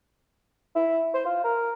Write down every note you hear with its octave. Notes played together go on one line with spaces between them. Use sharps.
E4
C5
F4
A#4